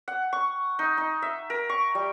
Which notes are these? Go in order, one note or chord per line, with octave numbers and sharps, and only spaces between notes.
F#5
C#6
D#4
D#4
E5
A#4
C#6
G3